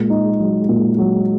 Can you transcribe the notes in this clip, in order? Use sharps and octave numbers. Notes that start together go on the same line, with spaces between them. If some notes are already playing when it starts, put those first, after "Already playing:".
Already playing: A#2 G#3
D#4
F#3
A#2
F#3